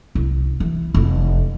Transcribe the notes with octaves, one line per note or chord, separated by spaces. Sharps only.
C2
E3
F1 E4